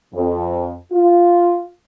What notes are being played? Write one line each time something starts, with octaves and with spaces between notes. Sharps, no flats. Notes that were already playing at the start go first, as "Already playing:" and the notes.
F2
F4